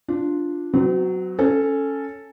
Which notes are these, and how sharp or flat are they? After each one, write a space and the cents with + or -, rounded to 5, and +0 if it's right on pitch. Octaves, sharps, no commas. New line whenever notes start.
D4 +0 F4 +0
F#3 +0 C4 -45
C#4 +0 A4 +0